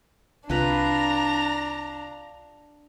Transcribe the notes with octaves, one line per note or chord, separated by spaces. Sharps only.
C2 D4 F4 B4 A#5